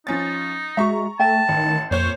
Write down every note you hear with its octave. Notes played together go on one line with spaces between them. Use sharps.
F3 C#4 D#4 A6
G#3 F#4 E5 A#5 C#6
A3 E5 G5 A5
A1 D#3
F2 A#2 C5 C#5 G6